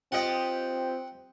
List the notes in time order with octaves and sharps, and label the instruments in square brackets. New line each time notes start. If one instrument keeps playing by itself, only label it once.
[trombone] C4 [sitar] F4 G4 D#5 [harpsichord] F#5 G5